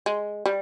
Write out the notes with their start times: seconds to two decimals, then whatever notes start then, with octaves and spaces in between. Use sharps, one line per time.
0.06 G#3
0.46 G3